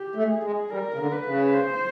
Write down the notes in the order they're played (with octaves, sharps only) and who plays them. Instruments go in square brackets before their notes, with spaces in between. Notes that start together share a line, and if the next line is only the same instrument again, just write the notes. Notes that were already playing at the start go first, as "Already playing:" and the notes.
Already playing: [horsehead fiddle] G4
[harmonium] A3
[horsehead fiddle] G#4
[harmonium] G#3
[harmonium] G3 [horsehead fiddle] A#4
[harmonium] C#3
D3
[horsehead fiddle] B4
[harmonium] C#3
[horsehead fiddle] C5